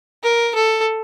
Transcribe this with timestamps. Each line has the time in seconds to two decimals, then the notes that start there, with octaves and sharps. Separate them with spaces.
0.23 A#4
0.55 A4